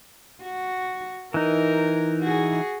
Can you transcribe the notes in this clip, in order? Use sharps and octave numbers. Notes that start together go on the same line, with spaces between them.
F#4
E3 D#4 A#4
F#4 G#4